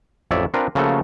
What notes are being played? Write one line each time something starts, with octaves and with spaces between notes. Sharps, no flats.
A1 F2 C#5 D5 E5
C4 D4 F4 A#4 B4
C#3 F3 A3 A#3 F#4 A4